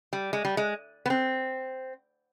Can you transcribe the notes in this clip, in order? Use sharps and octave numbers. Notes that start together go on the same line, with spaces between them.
G3
G#3
G3
G#3
B3
C4